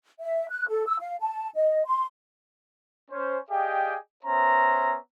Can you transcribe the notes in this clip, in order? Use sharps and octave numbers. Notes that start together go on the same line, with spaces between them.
E5
F#6
A4
E6
F5
A5
D#5
C6
C#4 C5
G4 G#4 D5 D#5 F5 G5
B3 C#4 C5 E5 A#5